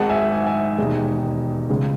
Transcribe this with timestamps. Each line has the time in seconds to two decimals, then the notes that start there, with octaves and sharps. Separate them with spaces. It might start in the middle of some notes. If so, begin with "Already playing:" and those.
Already playing: G#1 G#2 D#3 G#3 F#5 A5
0.09 E5 G#5
0.32 G#5
0.40 F#5
0.46 E5 G#5
0.78 E1 D#2 D#3 G#3
1.69 C#2 C#3 G#3